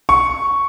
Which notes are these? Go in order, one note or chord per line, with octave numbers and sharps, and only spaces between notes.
C#6